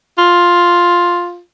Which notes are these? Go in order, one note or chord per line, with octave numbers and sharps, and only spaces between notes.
F4